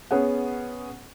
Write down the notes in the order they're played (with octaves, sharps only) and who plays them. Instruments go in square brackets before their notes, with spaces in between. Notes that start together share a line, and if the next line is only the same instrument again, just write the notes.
[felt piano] B3 C#4 G#4 C#5 F#5